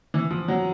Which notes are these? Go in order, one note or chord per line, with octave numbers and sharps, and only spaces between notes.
E3
F3
F#3